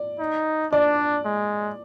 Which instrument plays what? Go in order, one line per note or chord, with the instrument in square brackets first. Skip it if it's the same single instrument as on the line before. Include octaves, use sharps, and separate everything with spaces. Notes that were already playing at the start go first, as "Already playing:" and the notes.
Already playing: [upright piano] D5
[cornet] D#4
[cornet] D4 [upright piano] D5
[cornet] G#3